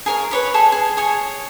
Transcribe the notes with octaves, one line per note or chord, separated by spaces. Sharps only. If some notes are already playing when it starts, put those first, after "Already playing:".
G#4 A#4 C#5 F5
B4 C#5 B5
G#4 A4 C#5
G#4
G#4 C#5 G#5